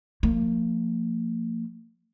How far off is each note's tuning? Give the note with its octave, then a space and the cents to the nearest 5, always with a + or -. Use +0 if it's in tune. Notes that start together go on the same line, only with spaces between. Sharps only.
F3 +5 A#3 -40